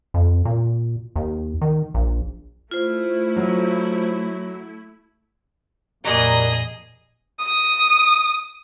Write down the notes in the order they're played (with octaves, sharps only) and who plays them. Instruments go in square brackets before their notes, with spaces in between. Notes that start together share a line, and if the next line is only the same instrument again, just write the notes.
[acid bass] F2
A#2
D#2
D#3
A#1
[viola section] A3 E4 [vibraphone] F4 C5
[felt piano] F#3
[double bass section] F2 A#2 [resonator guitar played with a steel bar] F#3 G3 A#3 [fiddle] G#4 D#5
[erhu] D#6